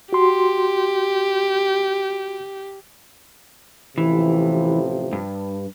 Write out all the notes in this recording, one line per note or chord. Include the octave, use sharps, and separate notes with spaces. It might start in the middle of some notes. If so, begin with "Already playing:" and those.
F#4 G4 C6
A1 C3 E3 F3
G2